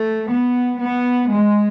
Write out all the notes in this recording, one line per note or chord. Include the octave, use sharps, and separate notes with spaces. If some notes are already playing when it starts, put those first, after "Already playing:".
Already playing: A3
B3
B3
G#3